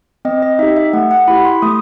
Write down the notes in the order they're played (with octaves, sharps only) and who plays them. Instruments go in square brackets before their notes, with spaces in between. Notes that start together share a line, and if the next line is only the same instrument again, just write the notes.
[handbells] C4 D#5
D#5
D#4 G4 E5
E5
A3 F#5
F#5
E4 G4 B5
C6
A3 D#6